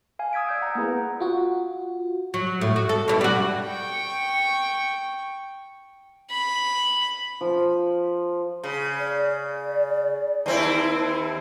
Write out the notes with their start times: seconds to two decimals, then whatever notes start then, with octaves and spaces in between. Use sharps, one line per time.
0.19 F5 G#5
0.33 D#6 E6 G#6 B6 D7
0.49 D5 G6
0.61 F#5 A#5
0.75 A#3 B3 E4 G#4 B4
1.20 F4 F#4
2.34 F#3
2.61 A2
2.76 F#4
2.89 A4
3.08 B2 G3 E4
3.21 G3 F#4
3.66 G5 C#6
6.31 B5
7.41 F3
8.64 C#3
8.99 D5
10.46 D#2 C4 E4